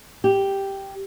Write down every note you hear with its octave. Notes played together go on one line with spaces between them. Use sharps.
G4